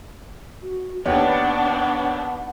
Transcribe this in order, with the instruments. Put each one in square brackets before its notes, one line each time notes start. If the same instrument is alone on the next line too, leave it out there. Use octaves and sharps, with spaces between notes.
[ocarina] F#4
[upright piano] D#2 [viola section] B3 D4 [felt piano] G4 B4 C#5 [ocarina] F#5